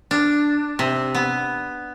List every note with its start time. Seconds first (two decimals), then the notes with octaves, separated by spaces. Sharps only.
0.11 D4
0.79 C3
1.15 B3